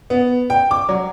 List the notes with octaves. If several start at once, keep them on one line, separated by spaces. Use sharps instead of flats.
B3
G5
D6
F#3